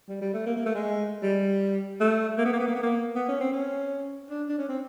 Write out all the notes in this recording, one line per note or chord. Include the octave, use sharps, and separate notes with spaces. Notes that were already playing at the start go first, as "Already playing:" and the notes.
G3
G3
A3
A#3
A#3
A3
G#3
G3
A3
A#3
B3
A#3
B3
A#3
B3
A#3
B3
C#4
C4
C#4
D4
D4
C#4
C4